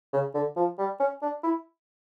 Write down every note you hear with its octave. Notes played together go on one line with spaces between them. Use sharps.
C#3
D3
F3
G3
C#4
D4
E4